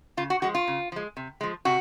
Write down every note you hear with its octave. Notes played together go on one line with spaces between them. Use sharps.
C#3 F4
F#4
F3 G#3 F#4
F4
C#3
F3 G#3
C3
F3 G#3
C3 F#4